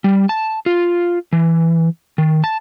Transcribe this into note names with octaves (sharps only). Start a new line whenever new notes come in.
G3
A5
F4
E3
D#3
A5